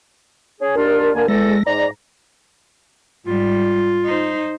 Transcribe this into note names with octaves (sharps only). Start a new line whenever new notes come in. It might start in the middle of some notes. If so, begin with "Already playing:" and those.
C#4 G#4
D#2 D4 F4 A#4
D3 A#3 G#5
E2 G#3 A4 A#6
G#2 D5 A#5
G#2 G3 F4
D#4 C5